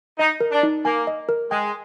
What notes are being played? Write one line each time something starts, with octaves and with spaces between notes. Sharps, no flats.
D#4 D#5
A#4
D4
D#4
A#3 G#5
D#5
A#4
G#3 G5